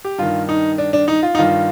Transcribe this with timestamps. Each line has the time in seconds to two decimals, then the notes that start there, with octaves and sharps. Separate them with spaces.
0.05 G4
0.18 G2 D#3 F4
0.49 D#4
0.78 D4
0.93 D4
1.08 D#4
1.23 F4
1.35 D#4
1.38 G2 D#3 F4